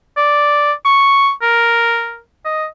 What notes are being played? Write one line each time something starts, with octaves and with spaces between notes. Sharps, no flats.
D5
C#6
A#4
D#5